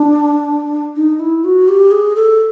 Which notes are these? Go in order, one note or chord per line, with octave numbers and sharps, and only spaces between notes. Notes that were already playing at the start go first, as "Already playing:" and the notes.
Already playing: D4
D#4
E4
F#4
G4
G#4
A4